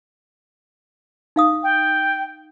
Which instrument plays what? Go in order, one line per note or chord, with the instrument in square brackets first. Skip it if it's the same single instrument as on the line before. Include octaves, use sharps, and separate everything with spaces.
[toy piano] D#4 F5 D#6
[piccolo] G5